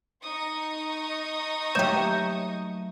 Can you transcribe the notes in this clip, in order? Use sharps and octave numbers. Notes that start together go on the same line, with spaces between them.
D#4 C#6 D#6
F#3 A3 A#3 G4 C#5 G6 E7